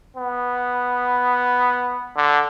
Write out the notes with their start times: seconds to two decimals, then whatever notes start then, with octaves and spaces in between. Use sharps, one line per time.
0.17 B3
2.16 D3